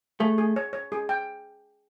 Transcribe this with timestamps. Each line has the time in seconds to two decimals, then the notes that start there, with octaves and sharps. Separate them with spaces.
0.20 A3 G#4
0.38 G#4
0.56 C#5
0.73 C#5
0.92 G#4
1.09 G5